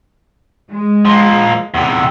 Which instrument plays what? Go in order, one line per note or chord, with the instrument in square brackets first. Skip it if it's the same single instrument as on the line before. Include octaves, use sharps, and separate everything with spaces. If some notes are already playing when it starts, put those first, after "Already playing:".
[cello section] G#3
[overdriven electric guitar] F3 A#3
E2 C3